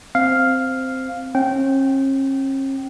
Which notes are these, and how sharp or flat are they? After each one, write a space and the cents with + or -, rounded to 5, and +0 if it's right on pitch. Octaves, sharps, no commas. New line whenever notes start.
C4 -5 F5 +0
C#4 -45 G5 -20